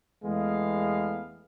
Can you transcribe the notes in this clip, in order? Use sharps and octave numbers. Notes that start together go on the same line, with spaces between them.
E2 G#3 A3 B3 F5